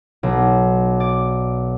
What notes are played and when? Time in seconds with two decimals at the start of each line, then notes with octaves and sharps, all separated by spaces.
0.23 B1
1.00 D5